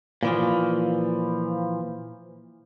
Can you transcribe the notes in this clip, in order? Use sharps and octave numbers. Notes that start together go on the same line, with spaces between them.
A#2 E3 F3